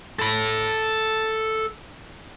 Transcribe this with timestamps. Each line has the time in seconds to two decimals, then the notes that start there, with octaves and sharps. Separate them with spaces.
0.19 A4 B5